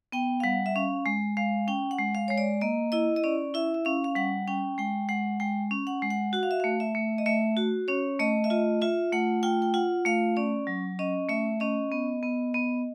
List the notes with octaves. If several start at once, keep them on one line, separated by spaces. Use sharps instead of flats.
B3 G5
F5
G3 F#5
E5
C#4 F5
G#3
G#3 F5
C#4 G5
F#5
G#3
F5
G#3 C#5
D5
A#3 D#5
E4 D#5
D#5
C#4 D5
E4 E5
E5
C#4 F5
F5
G3 F#5
C#4 G5
G#3 G5
G#3 F#5
G#3 G5
C#4
F#5
G#3
F#5
F#4 F#5
F5
E5
A3 F5
E5
A3
D#5
A3 E5
F#4
C#4 C#5
A3 D#5
E5
F4 D#5
F4 E5
A3 F#5
F4 G5
G5
F4 F#5
A3 F5
C#4 D5
F#3
C#4 D#5
A3 E5
C#4 D#5
B3
B3
B3